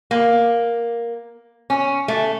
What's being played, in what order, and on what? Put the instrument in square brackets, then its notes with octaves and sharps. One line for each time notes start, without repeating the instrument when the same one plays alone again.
[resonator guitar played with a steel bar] A#3
C#4
A3